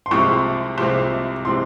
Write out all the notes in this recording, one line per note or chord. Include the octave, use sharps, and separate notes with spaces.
C6
C2 C3 F3 G#3 C4 C#6
C2 C3 F3 G#3 C4
C3 F3 G#3 C4 C6